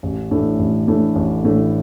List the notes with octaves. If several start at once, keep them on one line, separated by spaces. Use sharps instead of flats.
A1
A2 E3 A3 D4
A1
A2 E3 A3 D4
A1
A2 E3 A3 D4